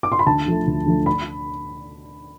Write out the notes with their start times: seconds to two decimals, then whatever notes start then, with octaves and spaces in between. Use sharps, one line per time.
0.03 D6
0.12 C6
0.19 B5
0.26 D2 A5
0.46 D3 F3 A3
0.67 D2
0.86 D3 F3 A3
1.06 B5